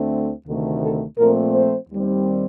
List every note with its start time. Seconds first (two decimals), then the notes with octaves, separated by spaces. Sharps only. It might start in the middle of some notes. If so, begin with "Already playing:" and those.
Already playing: D2 D3 A3 C4
0.46 D2 C3 D#3 A3
0.83 A4
1.18 A#2 F3 A3 C4 A#4
1.54 C5
1.89 D#2 D#3 G3 C4